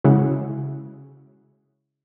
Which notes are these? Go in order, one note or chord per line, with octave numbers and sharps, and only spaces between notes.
C#3 G#3 E4 F#4